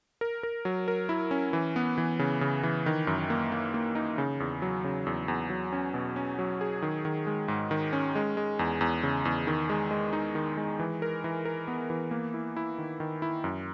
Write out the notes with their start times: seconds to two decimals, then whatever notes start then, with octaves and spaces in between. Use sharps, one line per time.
0.21 A#4
0.43 A#4
0.65 F#3
0.88 A#4
1.09 E4
1.31 C#4
1.53 E3
1.76 B3
1.98 E3
2.19 C#3
2.41 C#3
2.63 E3
2.86 D#3
3.07 F#2
3.30 A#3
3.52 A#3
3.74 A#3
3.95 D#4
4.18 C#3
4.40 E2
4.62 F#3
4.84 C#3
5.07 E2
5.28 E2
5.50 F#3
5.73 C#4
5.94 B2
6.16 C#4
6.39 F#3
6.61 G#4
6.82 D#3
7.05 D#3
7.27 G#3
7.48 G#2
7.71 D#3
7.93 C#4
8.15 G#3
8.37 G#3
8.59 E2
8.81 E2
9.03 C#3
9.25 E2
9.47 D#3
9.70 G#3
9.91 G#3
10.13 D#4
10.35 D#3
10.57 G#3
10.79 E3
11.02 A#4
11.24 E3
11.45 A#4
11.68 B3
11.90 E3
12.11 A#3
12.34 E4
12.56 E4
12.78 D#3
13.00 D#3
13.22 E4
13.44 F#2